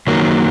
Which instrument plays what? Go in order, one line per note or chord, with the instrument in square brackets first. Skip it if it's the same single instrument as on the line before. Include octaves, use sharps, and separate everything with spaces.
[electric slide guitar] F#2 D#3 F#3 A#3